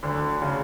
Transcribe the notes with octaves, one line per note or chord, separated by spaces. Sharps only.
D2 D3
C#3